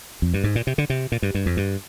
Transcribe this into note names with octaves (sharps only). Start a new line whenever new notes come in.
F2
G2
G#2
A#2
C3
D3
C3
A#2
G2
G2
F2
G2